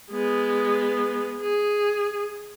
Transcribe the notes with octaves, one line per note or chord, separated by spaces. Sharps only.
G#3 B3
G#4